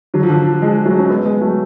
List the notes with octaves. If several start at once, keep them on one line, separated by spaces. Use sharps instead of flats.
D3 F#3
F3
D3
F3
F3 G#3
F#3 A3
C#4
G#3 B3
G#3 B3
F#3 A3